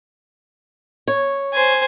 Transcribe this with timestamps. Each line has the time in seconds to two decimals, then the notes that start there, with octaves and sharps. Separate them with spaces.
1.08 C#5
1.53 C5 G#5